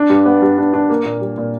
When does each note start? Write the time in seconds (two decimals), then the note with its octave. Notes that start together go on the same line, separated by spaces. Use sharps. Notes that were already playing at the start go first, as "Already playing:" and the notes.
Already playing: D4
0.10 G2
0.26 B3
0.42 G2
0.58 D4
0.73 D4
0.90 A#3
1.05 A#2
1.21 G3
1.38 A#2